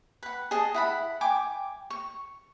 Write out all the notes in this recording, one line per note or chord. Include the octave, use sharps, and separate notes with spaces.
B4 F#5
G#4 D#5 A5
E4 F#5 B5
G5 G#5 D6
C#6